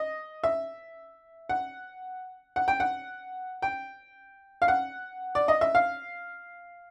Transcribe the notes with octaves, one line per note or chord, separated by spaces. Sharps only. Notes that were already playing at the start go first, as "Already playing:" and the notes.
Already playing: D#5
E5
F#5
F#5
G5
F#5
G5
F5
F#5
D5
D#5
E5
F5